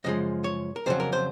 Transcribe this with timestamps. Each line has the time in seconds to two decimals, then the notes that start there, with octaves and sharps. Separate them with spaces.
0.04 F#2 C#3 F3 G#3 D#5
0.44 C#5
0.76 A#4
0.86 F2 C#3 F#3 C5
1.00 A#4
1.13 C5